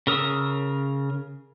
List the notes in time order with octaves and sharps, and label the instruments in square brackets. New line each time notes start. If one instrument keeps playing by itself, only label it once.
[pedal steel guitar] C#3 A#4 D#6 E6